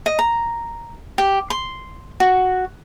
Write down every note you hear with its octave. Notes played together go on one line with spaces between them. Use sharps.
D#5
A#5
G4
C6
F#4